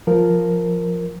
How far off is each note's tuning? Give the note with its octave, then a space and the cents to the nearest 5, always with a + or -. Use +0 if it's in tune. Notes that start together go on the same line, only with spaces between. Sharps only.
F3 +0 A#4 +0